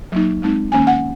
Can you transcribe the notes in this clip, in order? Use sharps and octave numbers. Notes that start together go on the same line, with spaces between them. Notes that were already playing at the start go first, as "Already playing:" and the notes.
F#3 A#3 D#4
G#3 C4 D#4
D#3 A#3 C#4 G#5
F#5